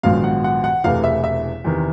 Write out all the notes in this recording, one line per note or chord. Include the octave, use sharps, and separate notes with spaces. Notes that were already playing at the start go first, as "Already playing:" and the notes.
A#1 G#2 D#3 F#3 B3 F5
F#5
F#5
F#5
E1 E2 C3 E3 A3 F5
E5
E5
E2 C3 D#3